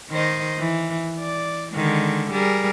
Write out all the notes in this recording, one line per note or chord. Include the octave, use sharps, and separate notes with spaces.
D#3 C5 D#5
E3
D5
D3 D#3 G#3
G3 G#4 A#4